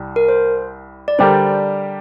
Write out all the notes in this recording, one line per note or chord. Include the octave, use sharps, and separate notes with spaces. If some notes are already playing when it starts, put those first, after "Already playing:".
Already playing: C2 G3
A#4
C5
D5
D3 G3 D4 G4 A#4 C5